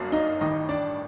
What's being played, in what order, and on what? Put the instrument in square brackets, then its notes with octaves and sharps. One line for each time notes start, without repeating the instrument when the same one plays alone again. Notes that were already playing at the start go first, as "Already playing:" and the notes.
Already playing: [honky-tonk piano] G1 F#2 F#3 A#3 D4
[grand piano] D#4 D#5
[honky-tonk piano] A1 G2 D#3 [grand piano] D#4 D#5
[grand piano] D4 D5